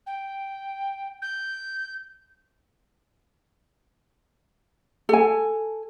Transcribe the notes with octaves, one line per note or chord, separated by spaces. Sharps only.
G5
G6
A4 G#5